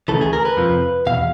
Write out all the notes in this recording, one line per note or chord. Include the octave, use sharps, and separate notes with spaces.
D2 C#3 E3 A4
G#4
A#4
B4
F2 C3 F3
E2 B2 F5